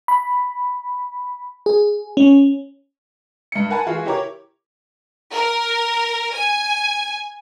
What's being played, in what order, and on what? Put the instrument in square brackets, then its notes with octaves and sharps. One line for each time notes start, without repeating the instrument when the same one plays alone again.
[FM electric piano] B5
G#4
C#4
[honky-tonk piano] G2 C#7
A#4 F#5 G#5 A5 B5
E3 F4 F#4 G#4
E4 G4 A#4 C#5 A#5 D6
[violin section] A#4
G#5